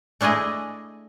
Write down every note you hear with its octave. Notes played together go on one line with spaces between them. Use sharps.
A3 D4 E4 G#4 D#5